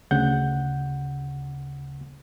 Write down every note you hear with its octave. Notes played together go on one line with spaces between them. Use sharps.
D2 C#3 F#5 G6